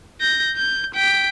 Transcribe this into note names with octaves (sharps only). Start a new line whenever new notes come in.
G6 A#6
G6
G5 B6